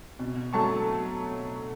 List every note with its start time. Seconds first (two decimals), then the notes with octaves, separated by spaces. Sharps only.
0.19 B2
0.53 F#3 A3 A5 C#6